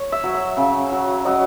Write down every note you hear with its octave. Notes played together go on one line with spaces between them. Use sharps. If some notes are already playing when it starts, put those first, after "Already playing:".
Already playing: C#5
E5
F#3
E5
C#3
F#3
F#3 D#5